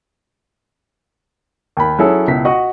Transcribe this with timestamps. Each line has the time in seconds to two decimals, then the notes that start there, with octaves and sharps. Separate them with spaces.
1.77 D#2 B5
1.99 F#3 C#4 E4 G#4 A4
2.28 C#2 B2 E4 B6
2.45 F#4 D#5 F#5 C#6